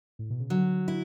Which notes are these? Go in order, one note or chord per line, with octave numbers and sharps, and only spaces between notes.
A2
B2
C#3
D3 F#3
E4